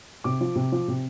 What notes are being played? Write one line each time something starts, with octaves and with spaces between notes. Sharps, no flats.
C3 D6
F3
C3
F3
C3